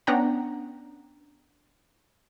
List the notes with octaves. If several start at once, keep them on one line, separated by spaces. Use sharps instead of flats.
B3 C#4 D4 F#5 G5 A#5